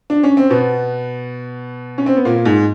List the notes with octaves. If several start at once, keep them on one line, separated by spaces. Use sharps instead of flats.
D4
C#4
C4
B2 B3
C#4
C4
B3
A#2 A#3
G#2 G#3